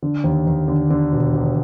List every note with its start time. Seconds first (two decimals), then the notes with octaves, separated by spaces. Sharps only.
0.02 D3
0.24 D#2
0.47 D#2
0.68 D3
0.90 D3
1.12 E1
1.33 E1